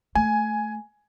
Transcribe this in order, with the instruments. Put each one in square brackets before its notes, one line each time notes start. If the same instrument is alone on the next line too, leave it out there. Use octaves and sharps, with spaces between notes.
[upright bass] A3 [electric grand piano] G#5